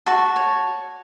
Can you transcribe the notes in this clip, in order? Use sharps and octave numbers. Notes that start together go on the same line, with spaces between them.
F#4 A5 C#6
C#5